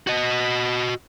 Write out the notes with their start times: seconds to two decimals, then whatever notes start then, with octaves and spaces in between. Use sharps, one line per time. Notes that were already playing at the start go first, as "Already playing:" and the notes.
0.07 F#4 D#5